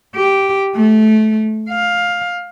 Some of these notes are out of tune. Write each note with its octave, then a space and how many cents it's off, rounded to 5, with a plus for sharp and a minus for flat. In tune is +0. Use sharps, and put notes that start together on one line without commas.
G4 -5
A3 -20
F5 +15